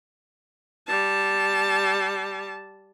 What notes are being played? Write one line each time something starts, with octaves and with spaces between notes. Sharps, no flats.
G3 A5